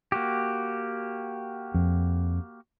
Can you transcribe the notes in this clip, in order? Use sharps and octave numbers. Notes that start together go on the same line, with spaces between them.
A#3 F#4 G4
F2